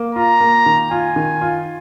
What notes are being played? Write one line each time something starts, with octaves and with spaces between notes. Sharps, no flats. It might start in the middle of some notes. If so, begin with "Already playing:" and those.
Already playing: A#3
F4 A#5
A#3
D#3
F4 G#5
D#3
F4